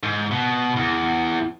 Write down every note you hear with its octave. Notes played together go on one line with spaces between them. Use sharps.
G#2
B2
E2